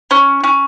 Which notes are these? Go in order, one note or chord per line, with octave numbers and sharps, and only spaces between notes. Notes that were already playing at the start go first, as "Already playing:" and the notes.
C#4
C#4